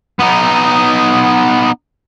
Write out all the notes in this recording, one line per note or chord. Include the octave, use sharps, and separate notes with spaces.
B3 D#4